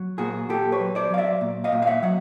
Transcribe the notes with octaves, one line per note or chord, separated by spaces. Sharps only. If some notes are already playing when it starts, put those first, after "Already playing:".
Already playing: F#3
A#2 F#4 G#4
A#2 G4 A4
B4 C#5
F#3
C5 D5
F#3 F5
D5 E5
A#2
D#5 F5
A#2
F5
E5 F#5
F#3 F#5